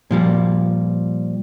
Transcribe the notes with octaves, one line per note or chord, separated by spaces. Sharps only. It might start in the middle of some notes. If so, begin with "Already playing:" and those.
A#2 F3 G3